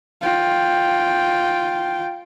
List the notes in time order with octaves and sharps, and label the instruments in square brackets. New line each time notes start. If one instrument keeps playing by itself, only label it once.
[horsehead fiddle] F4 G5